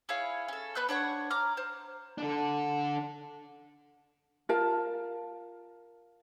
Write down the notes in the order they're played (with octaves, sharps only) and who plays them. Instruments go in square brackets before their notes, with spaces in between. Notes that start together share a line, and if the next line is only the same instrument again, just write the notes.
[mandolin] E4 G#4 C#5 F5
C#4 A4
B3 B4 F#6 G6
D4 C#5 F#5 C#6
A#5 D6 F6
C5
[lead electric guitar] D4 A4
[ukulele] F4 A#4 F5 A5